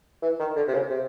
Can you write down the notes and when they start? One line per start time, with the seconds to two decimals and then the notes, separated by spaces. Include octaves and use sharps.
0.22 E3
0.39 D#3
0.56 D3
0.68 C3
0.74 C#3
0.90 C3